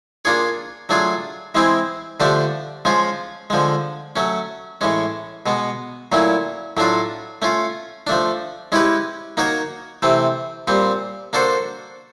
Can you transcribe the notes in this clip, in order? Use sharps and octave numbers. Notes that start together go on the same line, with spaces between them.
A#3 D4 F4 G#4 C#5
F#3 A3 D4 F4 G#4
E3 G#3 C4 E4 G#4
D3 F3 A3 D4 G4
F3 G#3 C#4 F4
D3 F3 G#3
F#3 A3 C#4
A2 E3 G#3 C#4
B2 G#3 B3
A#2 F#3 A3 C#4 E4
A2 F#3 A3 D4 F4
A3 C#4 F4
F3 A3 D4
G#3 C#4 E4 G4 B4
A#3 D#4 F#4 A#4 C#5
C3 E3 A3 C4
A#2 G3 C4
A#3 D4 F#4 A4 C5